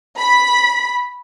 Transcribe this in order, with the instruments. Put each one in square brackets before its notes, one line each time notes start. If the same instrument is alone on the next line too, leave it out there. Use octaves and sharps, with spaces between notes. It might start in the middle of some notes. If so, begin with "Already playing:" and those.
[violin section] B5